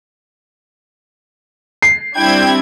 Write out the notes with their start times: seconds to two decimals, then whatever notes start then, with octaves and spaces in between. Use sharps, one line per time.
1.82 C7
2.16 G3 C4 D4 E4 G5 G#6